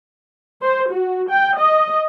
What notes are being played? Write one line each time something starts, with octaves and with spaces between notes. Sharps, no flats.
C5
F#4
G5
D#5